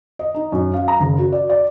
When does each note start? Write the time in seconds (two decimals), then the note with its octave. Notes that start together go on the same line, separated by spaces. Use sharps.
0.19 D#5
0.35 D#4
0.52 F#2
0.74 F5
0.88 A#5
1.00 F#1
1.18 F#4
1.32 D5
1.49 D5